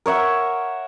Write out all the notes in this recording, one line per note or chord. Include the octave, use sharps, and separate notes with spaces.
A#4 C#5 E5 F#5